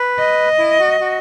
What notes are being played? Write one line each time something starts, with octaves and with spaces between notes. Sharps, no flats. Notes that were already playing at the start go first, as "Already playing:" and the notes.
Already playing: B4
D#5
E4
F#4
F#4